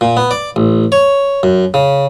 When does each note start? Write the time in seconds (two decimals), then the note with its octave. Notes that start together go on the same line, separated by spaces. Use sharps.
0.01 A#2
0.17 B3
0.31 D5
0.56 A1
0.92 C#5
1.43 F#2
1.74 C#3